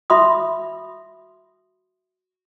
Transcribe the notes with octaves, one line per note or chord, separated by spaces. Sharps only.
F#4 E5 B5 C6 D#6